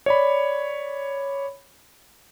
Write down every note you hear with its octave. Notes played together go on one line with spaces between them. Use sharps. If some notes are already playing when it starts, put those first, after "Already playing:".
C#5 D5 B5